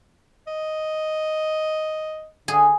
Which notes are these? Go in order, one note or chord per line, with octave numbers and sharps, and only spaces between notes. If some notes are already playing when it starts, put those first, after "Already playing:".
D#5
D3 G#4